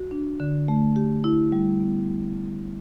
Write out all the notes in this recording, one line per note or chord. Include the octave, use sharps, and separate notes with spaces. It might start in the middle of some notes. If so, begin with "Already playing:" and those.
Already playing: F#4
D4
D3
A3
G4
E4
G3
B3